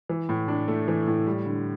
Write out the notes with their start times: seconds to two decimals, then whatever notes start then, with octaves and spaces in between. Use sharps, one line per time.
0.09 E3
0.29 A2
0.48 D4
0.68 A3
0.88 E3
1.07 A2
1.27 G3
1.46 D3